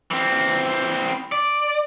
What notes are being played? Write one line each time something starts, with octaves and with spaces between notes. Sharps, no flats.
E3 C4
D5